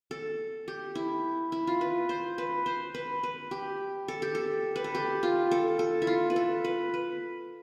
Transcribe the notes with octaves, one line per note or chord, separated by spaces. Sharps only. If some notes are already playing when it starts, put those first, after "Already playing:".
A4
G4
E4
E4
F4
B4
C5
B4
C5
B4
B4
G4
A4
G4
A4
B4
A4
G4
F4
A4
A4
E4
F4
B4
A4
B4
B4